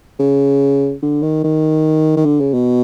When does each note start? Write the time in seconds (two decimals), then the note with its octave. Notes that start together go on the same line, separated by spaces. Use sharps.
0.19 C#3
1.02 D3
1.22 D#3
1.44 D#3
2.17 D#3
2.25 D3
2.40 C#3
2.54 B2